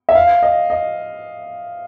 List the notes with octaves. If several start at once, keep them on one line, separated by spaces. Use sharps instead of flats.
E5
F5
D#5
D#5